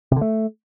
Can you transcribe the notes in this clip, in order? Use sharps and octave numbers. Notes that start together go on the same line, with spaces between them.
C3
D3
A3